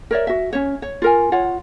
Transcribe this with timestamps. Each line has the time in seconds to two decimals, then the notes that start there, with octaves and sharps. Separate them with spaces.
0.11 A#4 C#5 D5 E5
0.27 F#4 E5
0.53 C#4 C#5
0.82 C#5
1.02 F4 A#4 G#5
1.32 F4 C#5 F#5